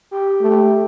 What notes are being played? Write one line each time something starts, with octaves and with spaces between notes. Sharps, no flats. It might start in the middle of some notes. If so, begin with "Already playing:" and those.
G4
A3